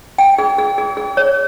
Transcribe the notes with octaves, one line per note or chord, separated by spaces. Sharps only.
G5
G#4
G#4
G#4
G#4
C#5